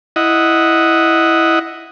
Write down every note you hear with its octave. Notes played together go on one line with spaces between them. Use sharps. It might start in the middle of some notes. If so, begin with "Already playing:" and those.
E4 D#5 F#5